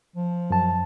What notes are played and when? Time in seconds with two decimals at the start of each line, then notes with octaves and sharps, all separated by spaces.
0.16 F3
0.50 F#2 A5